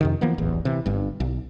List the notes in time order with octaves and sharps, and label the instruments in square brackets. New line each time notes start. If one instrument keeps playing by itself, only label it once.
[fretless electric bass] F2 C3 D#3
E3 F3 A#3 B3
D1 A1 E2
C3 E3
G1 G2
B1